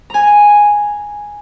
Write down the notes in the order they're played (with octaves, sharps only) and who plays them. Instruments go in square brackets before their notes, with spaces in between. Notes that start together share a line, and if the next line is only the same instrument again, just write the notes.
[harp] G#5 A#5